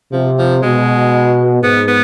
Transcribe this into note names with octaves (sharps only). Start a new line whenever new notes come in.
C3 F3
F3
B2 G#3
G#2 B3
B3